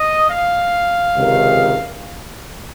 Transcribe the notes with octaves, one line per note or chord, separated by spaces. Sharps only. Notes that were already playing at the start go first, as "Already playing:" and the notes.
Already playing: D#5
F5
C#2 C3 D#3